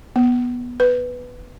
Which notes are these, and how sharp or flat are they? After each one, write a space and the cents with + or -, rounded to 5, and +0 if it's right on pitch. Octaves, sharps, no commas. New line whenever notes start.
B3 -10
B4 +5